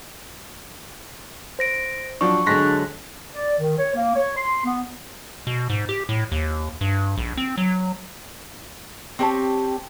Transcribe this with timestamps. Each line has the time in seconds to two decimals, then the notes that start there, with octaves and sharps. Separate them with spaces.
1.59 C5 A#6 D7
2.21 F3 F#3 D4 C#6
2.46 D3 F#3 G#3 D4 C6 A#6 B6
3.35 D5
3.59 D#3
3.78 C#5
3.95 A#3
4.16 C#5
4.37 C6
4.65 B3
5.47 B2
5.70 G#2
5.89 G4
6.09 A2
6.32 D#2
6.81 G2
7.17 A#1
7.37 C4
7.58 F#3
9.19 C4 G4 C#5 A5